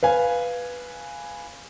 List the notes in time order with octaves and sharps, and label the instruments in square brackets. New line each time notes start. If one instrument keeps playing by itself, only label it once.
[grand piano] B4 F5 G#5